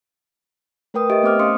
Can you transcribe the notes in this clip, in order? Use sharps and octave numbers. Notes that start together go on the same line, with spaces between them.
A3 A#4 B4 G5 D#6
G4 D#5 E5 D7
A3 B3 C4 C5 D6 F6
C#4 F5 C6 D#6 C#7